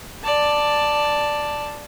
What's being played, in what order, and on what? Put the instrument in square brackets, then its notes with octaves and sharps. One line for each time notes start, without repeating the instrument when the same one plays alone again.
[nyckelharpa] D5 A5